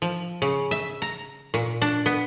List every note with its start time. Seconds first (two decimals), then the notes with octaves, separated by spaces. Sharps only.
0.02 F3
0.42 C#3
0.71 E5
1.02 A#5
1.54 A#2
1.82 D4
2.06 B3